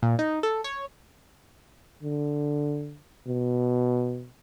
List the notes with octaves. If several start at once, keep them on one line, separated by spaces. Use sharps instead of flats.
A#2
D#4
A4
C#5
D3
B2